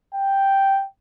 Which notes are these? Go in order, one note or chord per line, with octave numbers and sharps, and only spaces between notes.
G5